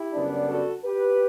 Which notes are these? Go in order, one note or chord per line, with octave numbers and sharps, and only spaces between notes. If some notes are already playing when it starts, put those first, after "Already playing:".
Already playing: E4 G4
F#2 C#3 G3 B3 D4
F#4 A4
G4 B4